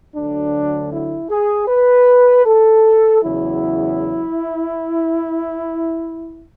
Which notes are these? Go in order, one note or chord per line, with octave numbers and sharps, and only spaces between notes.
D2 D3 F#3 D4
E4
G#4
B4
A4
E2 C#3 F#3 E4